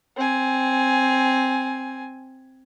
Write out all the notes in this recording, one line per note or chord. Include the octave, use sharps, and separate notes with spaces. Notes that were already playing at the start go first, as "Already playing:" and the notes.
C4 G#5